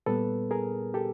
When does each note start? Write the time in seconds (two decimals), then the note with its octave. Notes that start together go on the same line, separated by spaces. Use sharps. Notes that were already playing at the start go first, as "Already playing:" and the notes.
0.06 A#2 G3 B3 A4 B4
0.51 G#4 A#4
0.94 G4 A4